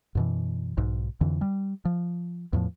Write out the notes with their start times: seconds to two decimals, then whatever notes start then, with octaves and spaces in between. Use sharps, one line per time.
0.15 F#2 B2 E3
0.77 B1 G#2
1.21 F2 D3 E3
1.41 G3
1.85 F3
2.53 E2 A2 F3